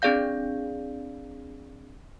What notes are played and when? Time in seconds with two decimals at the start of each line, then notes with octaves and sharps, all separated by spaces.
0.02 C4 D4 G#4 D5 F5 G6